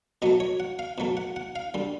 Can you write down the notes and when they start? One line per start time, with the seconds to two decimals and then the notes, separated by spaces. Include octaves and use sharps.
0.22 B2 F#3 A3 D#5
0.40 C#5
0.60 F#5
0.79 F5
0.98 B2 F#3 A3
1.17 F#5
1.36 F#5
1.56 F5
1.74 D3 G3